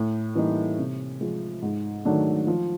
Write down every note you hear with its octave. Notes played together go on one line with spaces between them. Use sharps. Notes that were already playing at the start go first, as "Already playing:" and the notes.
Already playing: A2
E3 G3 A#3 D#4
C3
F3 G#3
G#2
D#3 F#3 A3 D4
F3